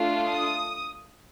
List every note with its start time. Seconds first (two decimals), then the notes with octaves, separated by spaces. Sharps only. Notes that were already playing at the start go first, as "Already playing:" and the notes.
Already playing: A3 D4 F4
0.28 D#6